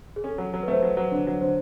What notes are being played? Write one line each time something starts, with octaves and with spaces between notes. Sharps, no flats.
G#4
C#4 A4
F#3
F#3
B4
A3 C5
F#3 B4
F#3
D3
F#3
D3 C5